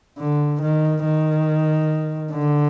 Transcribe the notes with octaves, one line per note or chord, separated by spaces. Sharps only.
D3
D#3
D#3
D3